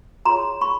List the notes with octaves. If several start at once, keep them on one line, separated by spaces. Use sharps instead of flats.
F4 G#4 C#5 A#5 C6
B5 C#6